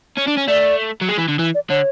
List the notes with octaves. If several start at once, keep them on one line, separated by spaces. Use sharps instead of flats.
C#4
D4
C#4
A3 D5
F#3
G#3
E3
D3
E3
D5
D3 C#5